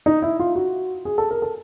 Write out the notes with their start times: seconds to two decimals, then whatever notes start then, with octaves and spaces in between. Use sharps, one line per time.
0.06 D#4
0.22 E4
0.39 F4
0.55 F#4
1.05 G#4
1.18 A4
1.31 A#4
1.42 A4